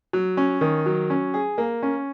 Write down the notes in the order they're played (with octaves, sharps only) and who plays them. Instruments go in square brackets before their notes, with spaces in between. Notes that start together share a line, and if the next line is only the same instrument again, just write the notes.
[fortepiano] F#3
C#4
D#3
F#3
C#4
G#4
A#3
C#4